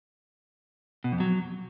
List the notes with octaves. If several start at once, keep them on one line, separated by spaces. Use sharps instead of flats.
B2
F2
F#3